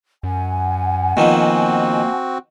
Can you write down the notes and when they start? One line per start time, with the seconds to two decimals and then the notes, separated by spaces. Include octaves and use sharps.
0.23 F#2 F#5 G#5
1.17 B2 D#3 F3 A#3 C4 F#4